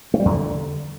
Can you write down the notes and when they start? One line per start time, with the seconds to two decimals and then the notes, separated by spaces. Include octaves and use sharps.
0.14 A3
0.20 G3
0.25 E2
0.31 D3